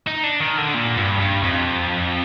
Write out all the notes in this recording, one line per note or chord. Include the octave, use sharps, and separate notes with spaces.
D#4
D4
D#3
D3
A#2
G2
G2
F2